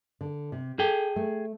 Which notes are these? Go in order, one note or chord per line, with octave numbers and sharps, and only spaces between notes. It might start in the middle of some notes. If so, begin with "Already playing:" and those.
D3
C3
G#4 A4 G5
A3